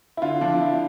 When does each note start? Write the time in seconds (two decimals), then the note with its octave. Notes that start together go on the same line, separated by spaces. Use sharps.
0.17 E4
0.22 D3 F4
0.41 F3 D4
0.60 F3 E4